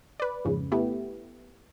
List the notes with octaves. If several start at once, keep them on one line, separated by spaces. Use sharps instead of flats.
B4 D5
F2 G#2 C#3
A3 B3 E4 G4